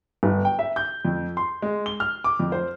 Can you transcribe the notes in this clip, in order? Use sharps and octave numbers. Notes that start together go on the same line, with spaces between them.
G1
G5
E5
G6
F2
C6
G#3
G7
F6
D6
F2
C5